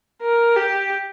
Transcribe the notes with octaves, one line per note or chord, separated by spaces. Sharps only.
A#4
G4